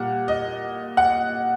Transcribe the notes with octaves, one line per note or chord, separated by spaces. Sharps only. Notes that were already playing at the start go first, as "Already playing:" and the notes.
Already playing: A#2 G3 F#5
D#5
F#5